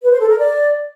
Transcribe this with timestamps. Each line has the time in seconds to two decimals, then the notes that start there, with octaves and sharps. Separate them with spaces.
0.03 B4
0.12 C5
0.20 A4
0.29 A#4
0.38 D5